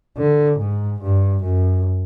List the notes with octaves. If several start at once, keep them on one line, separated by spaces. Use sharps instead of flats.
D3
G#2
G2
F#2